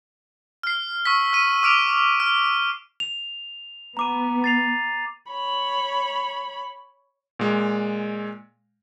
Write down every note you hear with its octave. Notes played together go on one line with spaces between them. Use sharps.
F6 C7
C#6 E6 B6
E6 D#7
D6 F6 D7 F7
F6
F7
B3 A#5 D6 D#7
A6 C7 F7
C#5 B5
A#2 G#3